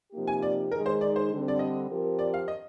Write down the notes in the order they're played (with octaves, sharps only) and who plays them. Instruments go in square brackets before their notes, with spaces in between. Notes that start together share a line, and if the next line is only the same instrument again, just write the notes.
[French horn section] C3 F3 A#3 D#4 G4
[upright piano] G#5
D5
[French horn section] D#3 G#3 D#4 G#4 [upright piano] A#4
[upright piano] C5
D5
C5
[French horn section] D3 G3 C4
[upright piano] D5
D#5
[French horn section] F3 C4 G4 A#4
[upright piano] D5
F5
D#5